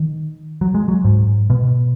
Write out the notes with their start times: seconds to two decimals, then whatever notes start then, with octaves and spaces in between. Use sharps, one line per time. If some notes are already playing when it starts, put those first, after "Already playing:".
Already playing: D#3
0.61 F#3
0.75 G#3
0.88 F#3
1.04 G#2
1.50 B2